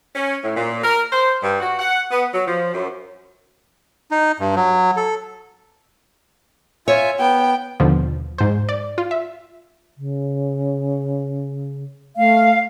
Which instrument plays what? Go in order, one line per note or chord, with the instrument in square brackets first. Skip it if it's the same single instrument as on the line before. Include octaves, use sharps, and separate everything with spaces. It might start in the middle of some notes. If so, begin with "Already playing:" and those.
[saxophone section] C#4
A2
A#2
A#4
C5
G2
F#4
F#5
B3
F#3
F3
F#2
[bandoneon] D#4
G2
F#3
A4
[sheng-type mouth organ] F4 E5 G#5 [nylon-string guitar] C#5
[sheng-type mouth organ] B3 [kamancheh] G5
[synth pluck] D#2 B2 D3 F3
G#2 C5
D5
F4
E5
[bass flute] C#3
[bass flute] A3 [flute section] F5